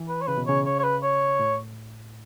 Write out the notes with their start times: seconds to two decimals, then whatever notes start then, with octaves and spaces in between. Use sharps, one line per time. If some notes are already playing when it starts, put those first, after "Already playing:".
Already playing: E3
0.08 B4
0.21 C#5
0.27 C#3 B4
0.37 B2
0.47 C#3 C#5
0.65 C#5
0.79 C#5
0.83 B4
1.03 C#5
1.40 A2